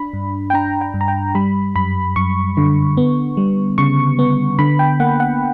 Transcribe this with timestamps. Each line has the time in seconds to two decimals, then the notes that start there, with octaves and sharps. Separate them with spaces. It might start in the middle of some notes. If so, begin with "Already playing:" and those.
Already playing: D4 B5
0.13 G2
0.50 G5
0.54 D4 A#5
0.81 G5
0.94 G2
1.01 A#5
1.08 G5
1.35 G3 B5
1.76 F#2 B5
2.16 F#2 C#6
2.57 D3
2.97 B3
3.37 G3
3.78 C#3 C#6
4.19 B3
4.59 D3 B5
4.79 G5
5.00 A#3 F#5
5.20 F#5